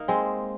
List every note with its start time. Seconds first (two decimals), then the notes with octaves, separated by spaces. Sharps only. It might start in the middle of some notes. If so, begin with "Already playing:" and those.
Already playing: A#3 D#4
0.08 G#3 C4